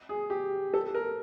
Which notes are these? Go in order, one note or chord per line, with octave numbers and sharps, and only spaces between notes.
G#4
G4
A4
A#4